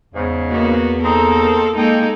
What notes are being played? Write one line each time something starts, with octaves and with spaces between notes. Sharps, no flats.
E2 G#2 C#3
A#3 B3 F#4
A#3 C4 D#4 A4 A#4
G#3 A#3 D#4 A4 G5